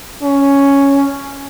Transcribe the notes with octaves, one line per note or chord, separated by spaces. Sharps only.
C#4